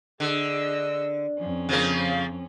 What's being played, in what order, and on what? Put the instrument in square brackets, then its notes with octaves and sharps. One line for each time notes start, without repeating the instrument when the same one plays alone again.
[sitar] D3 [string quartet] G#4 D#5 E6
[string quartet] F2 C#4
[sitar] C#3 F3 A#3